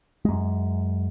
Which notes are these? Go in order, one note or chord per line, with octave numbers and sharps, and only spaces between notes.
F#2 G#3